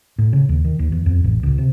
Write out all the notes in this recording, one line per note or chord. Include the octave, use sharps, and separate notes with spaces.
A2
C#3
D#2
D#3
D#2
E2
F2
A1
C#2
C3